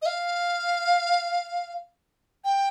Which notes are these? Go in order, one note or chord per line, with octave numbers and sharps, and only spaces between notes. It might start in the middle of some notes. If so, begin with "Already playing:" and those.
D#5
F5
G5